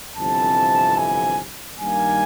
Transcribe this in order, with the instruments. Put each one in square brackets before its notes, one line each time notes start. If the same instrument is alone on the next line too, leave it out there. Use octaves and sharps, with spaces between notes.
[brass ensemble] G1 F2 C3 E3 A5
G#5
G2 D#3 G3 A#3 G#5